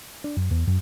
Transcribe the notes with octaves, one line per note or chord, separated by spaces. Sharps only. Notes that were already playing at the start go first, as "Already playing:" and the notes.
D4
F#2
E2
F#2